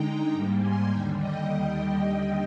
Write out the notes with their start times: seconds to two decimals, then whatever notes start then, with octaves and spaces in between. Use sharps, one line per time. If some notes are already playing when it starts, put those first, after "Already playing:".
Already playing: D3 G#3 D#4 G5 A#5
0.32 G#2 G3 A#3
0.60 G#5 C6
0.88 D#2 D3 G3 G5 A#5
1.17 D#5 G5